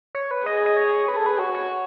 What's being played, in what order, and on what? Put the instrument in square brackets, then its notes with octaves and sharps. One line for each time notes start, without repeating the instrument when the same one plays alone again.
[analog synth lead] C#5
B4
[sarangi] G#4 [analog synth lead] D#5
[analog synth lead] D#5
C#5
[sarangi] G#4 [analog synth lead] B4
[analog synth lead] A4
B4
[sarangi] F#4 [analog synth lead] C#5
[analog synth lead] C#5